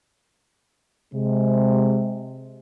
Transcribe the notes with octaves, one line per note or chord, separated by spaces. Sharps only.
C3 G#3